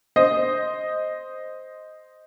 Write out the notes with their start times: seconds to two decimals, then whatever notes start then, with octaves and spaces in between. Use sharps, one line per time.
0.16 C5 D#5